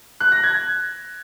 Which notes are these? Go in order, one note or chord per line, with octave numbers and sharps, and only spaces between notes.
F#6
A#6
G#6